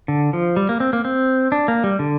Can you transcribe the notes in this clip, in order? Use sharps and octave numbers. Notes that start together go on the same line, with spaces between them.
D3
F3
G3
A#3
C4
A#3
C4
D4
A#3
G3
D3